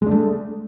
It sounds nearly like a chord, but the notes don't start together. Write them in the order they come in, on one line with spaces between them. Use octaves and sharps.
G#3 D4 A3